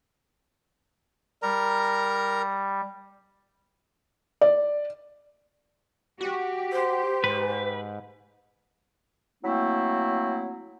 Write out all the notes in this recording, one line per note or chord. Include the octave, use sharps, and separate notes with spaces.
G3 A#4 A#5
D5
F#4 G4
C5
G#2 B4
F#3 A3 A#3 C4 E4